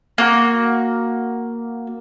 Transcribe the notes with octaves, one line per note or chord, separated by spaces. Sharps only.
A#3 F#4